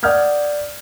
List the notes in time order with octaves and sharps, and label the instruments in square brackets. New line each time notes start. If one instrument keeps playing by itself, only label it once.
[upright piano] D5 F#5 D#6 F6 G6 G#6